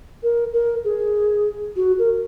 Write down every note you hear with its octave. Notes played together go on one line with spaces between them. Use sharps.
A#4
A#4
G#4
F#4
A#4